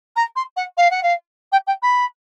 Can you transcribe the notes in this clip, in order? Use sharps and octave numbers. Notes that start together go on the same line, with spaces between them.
A#5
C6
F#5
F5
F#5
F5
G5
G5
B5